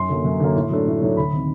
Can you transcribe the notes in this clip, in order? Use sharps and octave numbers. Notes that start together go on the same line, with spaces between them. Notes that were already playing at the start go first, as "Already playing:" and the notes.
Already playing: F#2 C6
D3 F#3 A#3
F#2
D3 F#3 A#3
A2
F#3 A3 D4
A2
F#3 A3 D4
D2 B5
C3 D#3